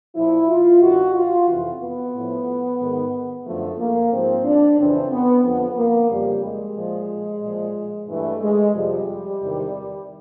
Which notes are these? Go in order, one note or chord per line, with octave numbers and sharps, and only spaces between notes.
A#2 F3 E4
F4
G2 D#3 F#4
F4
F2 C3 E3
B3
A2 F3
G#2 D#3
F#2 D3 F3 A3
A#3
G#2 F3 C4
D4
F2 C#3 E3 C4
B3
F2 D3 F3 B3
A#3
F2 C#3 F3 G3
G#3
A#2 F3
A#2 F3
G2 E3 A3
G#3
F2 C3 F3 G3
E2 C3 D#3